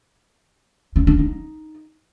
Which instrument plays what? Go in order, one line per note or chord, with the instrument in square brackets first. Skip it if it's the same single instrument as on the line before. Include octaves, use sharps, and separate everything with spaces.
[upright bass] C#4
D4
D#4